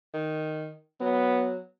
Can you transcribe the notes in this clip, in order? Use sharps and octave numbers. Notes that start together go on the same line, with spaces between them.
D#3
F#3 B3